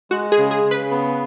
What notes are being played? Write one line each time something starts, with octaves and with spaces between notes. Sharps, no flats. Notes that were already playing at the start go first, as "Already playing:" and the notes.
G#3 F#4
G#4
C#3
G#4
C#3
B4
B3